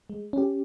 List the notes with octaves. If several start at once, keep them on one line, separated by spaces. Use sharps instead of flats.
G#3
C#4 G4